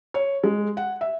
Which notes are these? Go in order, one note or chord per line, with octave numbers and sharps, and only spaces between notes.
C#5
G#3
F#5
E5